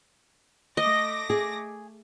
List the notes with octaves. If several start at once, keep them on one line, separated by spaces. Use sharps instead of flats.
A3 D#5 D6 A#6
G#4